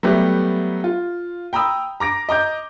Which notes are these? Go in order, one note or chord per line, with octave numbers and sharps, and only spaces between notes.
F#3 G3 A3 B3 G4
F4
G5 A#5 B5 D#6 E6
A#5 D6 A#6 D7
D#5 A#5 D6 G6